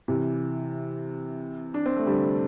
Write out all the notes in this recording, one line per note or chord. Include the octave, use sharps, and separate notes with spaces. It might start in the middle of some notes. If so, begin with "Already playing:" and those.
C3 E3
D4
C4
A3
D3 G3